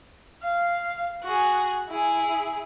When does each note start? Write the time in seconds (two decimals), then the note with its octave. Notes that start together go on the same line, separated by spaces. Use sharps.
0.43 F5
1.24 F#4 G#4
1.90 E4 G#4